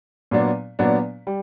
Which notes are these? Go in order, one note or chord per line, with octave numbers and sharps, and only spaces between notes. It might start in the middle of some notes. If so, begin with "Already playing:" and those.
A#2 F#3 B3 D4
A#2 F#3 B3 D4
G3